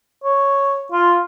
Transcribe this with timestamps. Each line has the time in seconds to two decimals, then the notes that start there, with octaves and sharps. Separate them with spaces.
0.24 C#5
0.92 F4